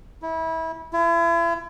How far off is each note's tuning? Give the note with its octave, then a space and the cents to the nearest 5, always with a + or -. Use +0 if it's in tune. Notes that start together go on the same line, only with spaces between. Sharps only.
E4 -25
E4 +40